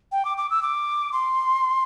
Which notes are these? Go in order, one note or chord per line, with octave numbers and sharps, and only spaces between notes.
G5
D6
D6
E6
D6
C6